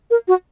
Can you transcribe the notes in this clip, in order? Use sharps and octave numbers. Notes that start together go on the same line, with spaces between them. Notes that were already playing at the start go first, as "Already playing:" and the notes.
A#4
F#4